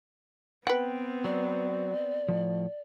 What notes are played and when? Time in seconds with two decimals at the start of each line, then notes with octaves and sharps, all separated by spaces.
0.67 B3 C4 B4 F#5 G5
1.24 F#3 D5
2.28 A2 F3